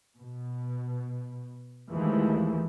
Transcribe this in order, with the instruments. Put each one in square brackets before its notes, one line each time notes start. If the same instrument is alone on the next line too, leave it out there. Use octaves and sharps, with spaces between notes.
[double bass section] B2
D#2 E3 F3 G#3 A3